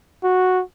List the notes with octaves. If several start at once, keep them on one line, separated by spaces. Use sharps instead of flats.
F#4